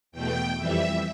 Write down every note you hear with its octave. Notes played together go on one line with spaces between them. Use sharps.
E2 B2 A3 G5
F2 E3 G3 E5